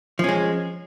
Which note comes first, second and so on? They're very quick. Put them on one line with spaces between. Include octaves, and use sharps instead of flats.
F3 C#4 G#3